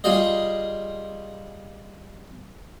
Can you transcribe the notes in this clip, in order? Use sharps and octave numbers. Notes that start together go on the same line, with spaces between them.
G3 F4 G#4 D#5